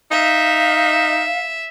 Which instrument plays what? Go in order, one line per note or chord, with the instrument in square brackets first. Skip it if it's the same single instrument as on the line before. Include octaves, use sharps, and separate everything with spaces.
[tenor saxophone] D#4 [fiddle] E5 [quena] F5